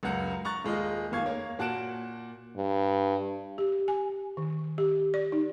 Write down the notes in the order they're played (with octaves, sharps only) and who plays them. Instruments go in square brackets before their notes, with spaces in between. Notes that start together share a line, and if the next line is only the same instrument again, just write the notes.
[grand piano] C#2 F#2 F#5 A#5
A#5 C#6 F#6 A6
D#1 G#3 F4 D#5
F1 D#2 F5 C#6 G#6
A#3 C#5
A#2 F#4 A5 F#6 D7 E7
[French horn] G2
[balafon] G4
G#5
D#3
G4
D5
D#4